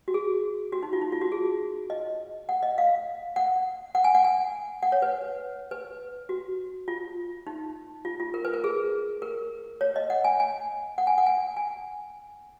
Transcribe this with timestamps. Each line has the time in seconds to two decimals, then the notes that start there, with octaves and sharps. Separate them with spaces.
0.08 F#4
0.14 G#4
0.73 F#4
0.83 D#4
0.93 F4
1.02 D#4
1.12 F4
1.21 F#4
1.32 G#4
1.90 D#5
2.49 F#5
2.63 D#5
2.78 F5
3.36 F#5
3.95 F#5
4.04 G#5
4.15 F#5
4.24 G#5
4.83 F#5
4.92 C#5
5.02 B4
5.71 B4
6.29 F#4
6.88 F4
7.47 D#4
8.05 F4
8.20 F4
8.34 A#4
8.45 B4
8.54 A#4
8.64 G#4
9.22 A#4
9.81 C#5
9.96 D#5
10.10 F#5
10.24 G#5
10.40 G#5
10.98 F#5
11.07 G#5
11.18 F#5
11.26 G#5
11.57 G#5